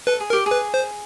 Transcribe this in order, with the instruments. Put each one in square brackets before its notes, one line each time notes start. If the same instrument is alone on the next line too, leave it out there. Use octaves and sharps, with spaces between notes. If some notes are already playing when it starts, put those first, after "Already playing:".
[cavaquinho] A4 [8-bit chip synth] B4
[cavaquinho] G#4
[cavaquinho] G4 [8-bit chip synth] A#4
[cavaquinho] G#4
[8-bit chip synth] B4
C5